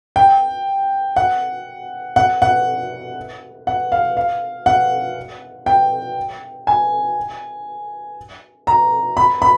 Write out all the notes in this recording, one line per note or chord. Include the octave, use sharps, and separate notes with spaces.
G5
F#5
F#5
F#5
F#5
F5
F5
F#5
G5
G#5
A#5
B5
B5